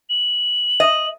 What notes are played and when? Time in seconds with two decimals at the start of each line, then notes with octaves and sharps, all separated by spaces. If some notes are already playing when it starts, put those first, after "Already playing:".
0.10 F#7
0.80 D#5